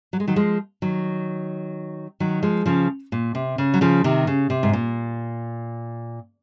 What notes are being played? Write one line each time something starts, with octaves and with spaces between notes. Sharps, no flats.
F#3
G#3
D#3 F#3
F3 G#3
D#3 F#3
D#3 F#3
F3 G#3
C#3 F3
A#2
C3
C#3
F#3
C#3 F3
C3 D#3
C#3
C3
G#2
A#2